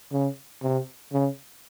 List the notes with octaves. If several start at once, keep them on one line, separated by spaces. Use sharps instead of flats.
C#3
C3
C#3